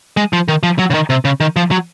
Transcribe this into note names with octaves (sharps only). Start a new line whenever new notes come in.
G#3
F3
D#3
F3
F#3
C#3
D#3
C3
C#3
D#3
F3
F#3